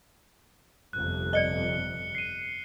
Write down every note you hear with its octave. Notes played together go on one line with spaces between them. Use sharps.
G1 F2 C3 F#6
D5 D#5 F#6 C#7 G7
C7 D#7